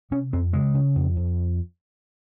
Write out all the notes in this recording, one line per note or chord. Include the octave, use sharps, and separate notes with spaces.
C3 C#4
F2 C4
C#3 G#3
C#3
F2
F2